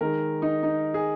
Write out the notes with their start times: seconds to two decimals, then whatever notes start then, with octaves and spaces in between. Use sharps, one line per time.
0.01 D#3 G#3 A#4
0.42 D#4
0.63 D#4
0.94 G#4